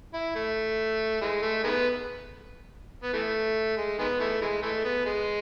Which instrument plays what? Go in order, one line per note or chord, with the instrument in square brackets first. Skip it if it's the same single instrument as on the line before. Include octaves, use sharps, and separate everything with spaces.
[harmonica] E4
A3
E3 G#3
A3
D#3 G#3 B3
B3
E3 A3
G#3
D#3 G#3 B3
E3 A3
E3 G#3
E3 A3
B3
G#3